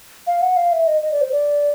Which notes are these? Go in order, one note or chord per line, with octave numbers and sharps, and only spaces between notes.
F5
F#5
F5
E5
D#5
D#5
D5
C5
D5